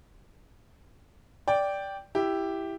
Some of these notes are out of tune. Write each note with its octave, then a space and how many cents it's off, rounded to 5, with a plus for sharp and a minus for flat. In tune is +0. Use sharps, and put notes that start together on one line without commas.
D5 -10 G5 +0
E4 +5 G4 +0